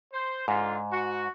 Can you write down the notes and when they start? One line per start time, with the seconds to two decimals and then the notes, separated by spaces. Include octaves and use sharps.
0.13 C5
0.48 G#2 D3 F4
0.91 F#4